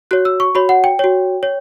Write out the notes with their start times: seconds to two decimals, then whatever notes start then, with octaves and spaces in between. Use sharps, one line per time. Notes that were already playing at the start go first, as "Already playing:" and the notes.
0.11 F#4 C#5 F#6
0.25 E6
0.40 C#6
0.55 F#4 C#5 B5
0.69 F#5
0.84 G5
0.99 F#4 C#5
1.43 C#5